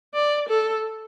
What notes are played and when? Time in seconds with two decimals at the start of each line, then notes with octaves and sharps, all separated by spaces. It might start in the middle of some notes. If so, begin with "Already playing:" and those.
0.14 D5
0.49 A4